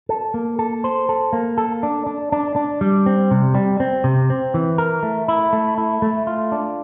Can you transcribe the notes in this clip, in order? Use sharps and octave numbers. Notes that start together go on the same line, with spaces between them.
A4
A#3
A4
C5
A4
A#3
A4
D4
D4
D4
D4
G3
C4
C3
G3
C4
C3
C4
E3
A#4
A3
E4
A3
E4
A3
F4
D4